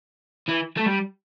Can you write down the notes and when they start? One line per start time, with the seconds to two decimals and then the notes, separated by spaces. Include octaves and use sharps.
0.49 E3
0.77 A3
0.86 G3